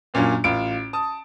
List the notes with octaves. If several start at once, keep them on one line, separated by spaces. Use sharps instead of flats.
F#2 A#2 F#3 C#4 D4 F4
A1 F4 D7
A5 D#6